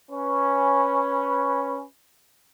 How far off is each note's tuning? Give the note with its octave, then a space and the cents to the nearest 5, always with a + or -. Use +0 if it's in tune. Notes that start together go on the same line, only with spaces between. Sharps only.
C#4 +0 B4 -5